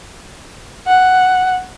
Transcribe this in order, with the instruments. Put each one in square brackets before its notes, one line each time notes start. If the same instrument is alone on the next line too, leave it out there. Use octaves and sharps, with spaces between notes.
[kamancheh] F#5